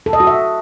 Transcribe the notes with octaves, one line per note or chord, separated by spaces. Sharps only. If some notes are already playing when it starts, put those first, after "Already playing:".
A4
D#5
F#4
E5